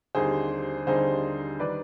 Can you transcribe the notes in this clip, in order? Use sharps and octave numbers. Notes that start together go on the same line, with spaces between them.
D#2 D3 G3 C4 D#4 G#4 C5
D#2 D3 G3 C4 D#4 G#4 C5
D#3 G3 D4 B4 D5